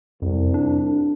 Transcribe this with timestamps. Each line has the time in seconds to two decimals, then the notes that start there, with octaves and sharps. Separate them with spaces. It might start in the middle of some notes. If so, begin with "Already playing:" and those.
0.22 C2 F2
0.54 D4